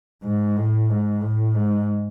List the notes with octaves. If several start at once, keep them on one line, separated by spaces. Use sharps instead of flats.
G#2
A2
G#2
A2
G#2